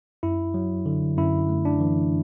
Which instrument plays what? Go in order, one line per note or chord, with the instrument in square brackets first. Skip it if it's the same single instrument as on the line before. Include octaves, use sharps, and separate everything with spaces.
[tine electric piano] F#2 E4
F#3
D3
F#2 E4
A3
D4
E3